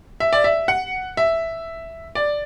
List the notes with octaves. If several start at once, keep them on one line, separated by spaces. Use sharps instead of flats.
E5
D5
E5
F#5
E5
D5